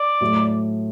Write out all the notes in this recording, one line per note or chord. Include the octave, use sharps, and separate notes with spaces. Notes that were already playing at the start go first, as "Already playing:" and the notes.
Already playing: D5
A2 F#3 A3